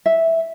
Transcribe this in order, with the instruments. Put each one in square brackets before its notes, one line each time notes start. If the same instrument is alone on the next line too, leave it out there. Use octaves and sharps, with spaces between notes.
[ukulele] E5